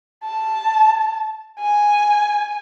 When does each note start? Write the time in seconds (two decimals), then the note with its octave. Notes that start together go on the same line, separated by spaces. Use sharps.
0.25 A5
1.60 G#5